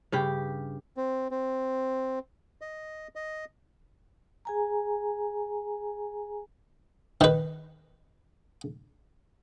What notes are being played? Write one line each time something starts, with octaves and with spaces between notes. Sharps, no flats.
G2 C#3 G4
C4
C4
D#5
D#5
G#4 G#5 A#5
D#3 B4